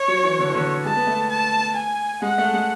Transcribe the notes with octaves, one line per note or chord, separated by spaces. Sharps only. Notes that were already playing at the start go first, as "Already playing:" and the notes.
Already playing: C#5
F#3
E3
D3
E3
D3
G#3 A5
B3
A3
A5
G#5
G#3 F#5
A3
G#3